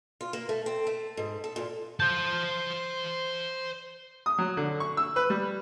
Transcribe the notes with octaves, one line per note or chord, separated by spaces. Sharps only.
F4
A#3
A3
C4
A3
G#2
A4
A#2
C5 A5 G6
D#6
F#3
D3
C#6
E6
B4
G3